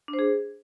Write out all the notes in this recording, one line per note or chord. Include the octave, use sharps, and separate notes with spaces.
D4
C5
G#4